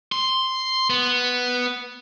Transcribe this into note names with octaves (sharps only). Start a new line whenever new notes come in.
C6
B3